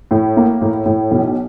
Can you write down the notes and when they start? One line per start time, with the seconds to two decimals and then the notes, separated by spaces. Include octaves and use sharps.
0.11 A2
0.37 A#3
0.61 A2
0.86 A2
1.11 B1